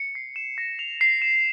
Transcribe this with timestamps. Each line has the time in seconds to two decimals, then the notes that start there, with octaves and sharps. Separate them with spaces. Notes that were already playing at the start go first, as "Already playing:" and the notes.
Already playing: C#7
0.15 C7
0.36 E7
0.58 A#6
0.79 F7
1.01 C7
1.22 E7